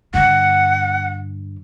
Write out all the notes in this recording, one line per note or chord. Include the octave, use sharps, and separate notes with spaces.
G2 D3 F#5